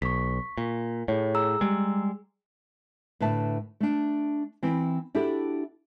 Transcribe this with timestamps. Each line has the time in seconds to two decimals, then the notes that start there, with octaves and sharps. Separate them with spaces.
0.02 B1 C#6 B6
0.58 A#2
1.08 A2 G#4 C#5
1.35 G#4 A#5 E6
1.61 G3 G#3
3.20 A2 D3 B4 E5 A5
3.80 A3 D4
4.63 E3 C4 E4
5.15 D4 E4 F#4 G4 A4